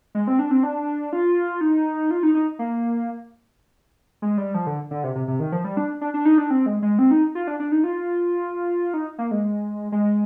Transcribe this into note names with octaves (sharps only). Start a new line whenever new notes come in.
G#3
C4
D4
C4
D4
F4
D#4
F4
D#4
D#4
A#3
G#3
G3
F3
D3
D3
C3
C3
C3
D#3
F3
G3
D4
D4
D4
D#4
D4
C4
G#3
G#3
C4
D#4
F4
D4
D4
D#4
F4
D#4
A#3
G#3
G#3